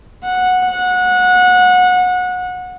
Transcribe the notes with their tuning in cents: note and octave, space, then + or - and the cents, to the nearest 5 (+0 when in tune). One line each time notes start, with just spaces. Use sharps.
F#5 -10
F#5 -25